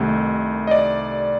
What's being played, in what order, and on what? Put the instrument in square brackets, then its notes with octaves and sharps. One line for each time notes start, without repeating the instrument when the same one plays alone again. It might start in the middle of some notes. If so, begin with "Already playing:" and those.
Already playing: [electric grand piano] C2 C3 D#3 A3
D#5
D5